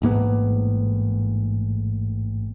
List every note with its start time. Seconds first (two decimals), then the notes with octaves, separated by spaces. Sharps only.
0.02 A1 G#2 A#3 B3